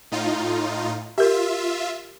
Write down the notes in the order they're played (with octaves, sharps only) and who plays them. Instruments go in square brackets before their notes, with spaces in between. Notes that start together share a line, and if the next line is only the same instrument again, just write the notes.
[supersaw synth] A2 D#4 F4
[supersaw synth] F4 E5 [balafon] G4 A#4